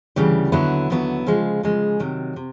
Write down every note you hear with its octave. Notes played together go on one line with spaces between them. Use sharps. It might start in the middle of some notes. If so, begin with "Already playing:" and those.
D2 C#3 E3 G3
D#2 D3 F#3 B3 E4
D#2 D3 F#3 B3 E4
C#3 F3 G#3
C#3 F3 G#3
C3 D#3 F#3
C3